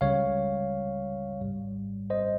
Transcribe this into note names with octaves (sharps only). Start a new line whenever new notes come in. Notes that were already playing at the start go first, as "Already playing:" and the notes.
C#2 C#3 G3 C#5 F5
G#1 G#2 G3
C5 D#5